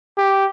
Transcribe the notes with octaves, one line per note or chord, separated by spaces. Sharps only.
G4